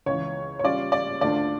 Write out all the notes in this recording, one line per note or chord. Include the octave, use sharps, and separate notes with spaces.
C#2 C#3 E3 C#5
C#5
C#3 G3 C#4 F4 D5
D5
D2 D3 A3 D4 F4 D5